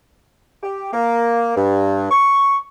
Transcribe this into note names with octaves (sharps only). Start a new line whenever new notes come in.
G4
A#3
G2
C#6